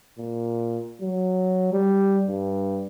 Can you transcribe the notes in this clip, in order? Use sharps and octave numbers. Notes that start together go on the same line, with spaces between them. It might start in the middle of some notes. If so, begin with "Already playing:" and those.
A#2
F#3
G3
G2